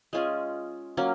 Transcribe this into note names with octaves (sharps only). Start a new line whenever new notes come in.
G#3 C#4 F4 G#4
F#3 A#3 C#4